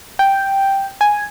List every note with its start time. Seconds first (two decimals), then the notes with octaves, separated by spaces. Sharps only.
0.19 G5
1.01 G#5